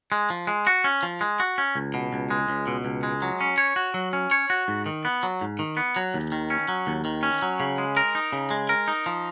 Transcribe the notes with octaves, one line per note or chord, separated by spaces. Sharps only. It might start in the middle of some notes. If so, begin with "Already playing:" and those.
G#3
F3
G#3
F#4
C#4
F3
G#3
F#4
C#4
C#2
B2
C#2
G#3
C#2
B2
C#2
G#3
F#3
C#4
C#5
F#4
F#3
C#4
C#5
F#4
G#2
D#3
B3
F#3
G#2
D#3
B3
F#3
D#2
D#3
C#4
F#3
D#2
D#3
C#4
F#3
C#3
G#3
A#4
D#4
C#3
G#3
A#4
D#4
F3